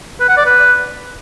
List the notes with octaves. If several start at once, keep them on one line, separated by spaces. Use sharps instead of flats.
B4
F#5
D5
B4